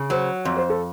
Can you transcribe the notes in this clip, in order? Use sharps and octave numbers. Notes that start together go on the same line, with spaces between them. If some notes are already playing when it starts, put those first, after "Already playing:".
Already playing: C#3
F#3 C5
F2
C5
A4